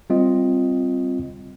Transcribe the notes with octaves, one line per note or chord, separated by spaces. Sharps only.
G3 C4 F4 D#5